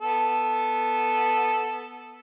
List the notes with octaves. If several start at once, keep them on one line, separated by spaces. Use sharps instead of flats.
B3 A4